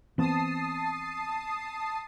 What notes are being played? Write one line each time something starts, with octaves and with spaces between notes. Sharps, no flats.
E3 B3 C4 A5 D#6 C7